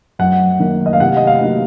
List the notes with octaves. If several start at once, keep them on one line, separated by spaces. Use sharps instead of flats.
F#2 F#5
D#3 A#3
D#5
F5
C3 F#5
D#5
F5
F#3 A#3 D#4